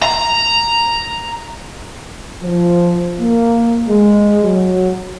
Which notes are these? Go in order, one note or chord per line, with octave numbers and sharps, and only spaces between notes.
A#5
F3
A#3
G#3
F#3